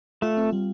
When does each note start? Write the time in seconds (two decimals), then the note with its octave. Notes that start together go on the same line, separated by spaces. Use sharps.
0.22 A3 F4
0.37 C4
0.53 G3